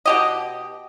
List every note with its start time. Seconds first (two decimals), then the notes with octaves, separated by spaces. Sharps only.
0.05 B2 G4 D#5